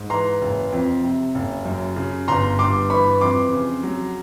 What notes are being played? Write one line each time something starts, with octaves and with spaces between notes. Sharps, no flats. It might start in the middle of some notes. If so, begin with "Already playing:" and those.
Already playing: G#2
E3 A#5 C6
F#1
F2
C3
F#1
F#2
C#3
G1 A#5 C6
G2 C6 D6
E3 B5 C#6
F2 C6 D6
C#3
F#3